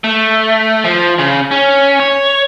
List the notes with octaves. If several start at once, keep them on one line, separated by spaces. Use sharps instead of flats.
A3
F3
C#3
C#4
C#5